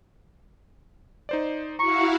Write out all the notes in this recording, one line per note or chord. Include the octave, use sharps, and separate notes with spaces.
D#4 C5 D5
E4 F#4 F5 A#5 C#6